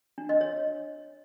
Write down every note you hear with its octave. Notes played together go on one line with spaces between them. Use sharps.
D4
D#5
C#5